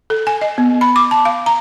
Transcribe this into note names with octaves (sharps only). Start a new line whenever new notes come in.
A4
G#5
D#5
B3
B5
D6
A5
F5
A#5